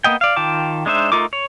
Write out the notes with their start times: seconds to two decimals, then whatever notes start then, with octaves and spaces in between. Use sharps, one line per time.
0.04 A#3 B3 D#5 G5
0.21 D5 F5
0.36 D#3 F4 G5 A5 D6
0.86 G#3 D4 D#4 C5 E5
1.12 A3 D#4 F4 A#4 D6
1.33 C#5